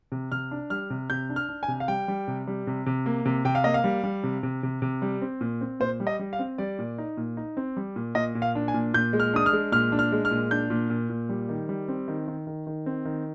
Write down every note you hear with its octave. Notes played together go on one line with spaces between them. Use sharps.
C3
C3 F6
D4
G3 F6
C3
C3 G6
D4
F6
D4
G#5
C3
F5
G3 G5
G3
C3
G3
C3
C3
A#3
C3
C3 G5
F5
A#3 D#5
F5
G3
G3
C3
C3
C3
C3
G3
C4
A#2
C4
A#2 C5
G3
D#5
G3
F5
C4
G3 D5
A#2
D#4
A#2
D#4
C4
G3
A#2
A#2 D#5
A#2
F5
D4
G#5
A#2
A#2 G6
G#3
F6
D4 D#6
F6
G#3
A#2 F6
D4
F6
G#3
F6
A#2
D4 G6
A#2
A#2
A#2
G3
D#3
G3
C4
D#3
D#3
D#3
D#3
C4
D#3